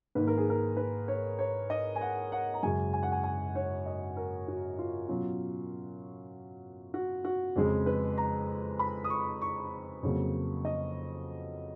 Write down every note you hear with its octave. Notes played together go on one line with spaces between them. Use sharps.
G#2 D#3 A#3 B4
A#4
G#4
A#4
B4
C#5
C#5
D#5
G#5
F#5
F#5
A#5
F#2 C#3 G#3 G#5
G#5
F#5
G#5
G#5
C#5
D#5
A#4
F#4
F4
B2 F#3 C#4 F4
F#4
F#4
F2 C#3 G#3 G#4
B4
A#5
B5
D#6
C#6
C#6
F2 C#3 F#3 A#3
D#5